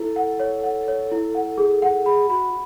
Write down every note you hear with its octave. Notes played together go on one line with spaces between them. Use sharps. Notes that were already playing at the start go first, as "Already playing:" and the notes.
Already playing: E4 A4
F#5
C#5
F#5
C#5
E4
F#5
G#4
F#5
G#4 B5
F#4 B5